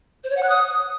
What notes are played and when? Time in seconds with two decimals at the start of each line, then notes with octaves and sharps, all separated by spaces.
0.24 C5
0.30 C#5
0.36 F#5
0.43 F#6
0.49 D#6